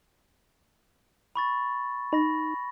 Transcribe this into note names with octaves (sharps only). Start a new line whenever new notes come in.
B5 C#6 A6
D#4 B5 A#6